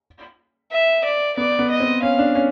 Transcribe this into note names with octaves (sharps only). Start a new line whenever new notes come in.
E5
D5
B3 D5
B3
D#5
C4
C#4 F5
D4
C#4